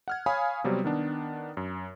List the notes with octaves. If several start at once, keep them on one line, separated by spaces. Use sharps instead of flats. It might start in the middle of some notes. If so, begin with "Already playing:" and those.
F#5 F6 G#6
C#5 F5 G#5 B5 D#6
C3 F#3 G3 B3 C4
D#3 B3 D4
F#2